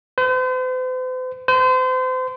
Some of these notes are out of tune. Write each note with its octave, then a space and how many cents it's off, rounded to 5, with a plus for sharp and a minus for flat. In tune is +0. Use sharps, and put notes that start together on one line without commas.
C5 -45
C5 -35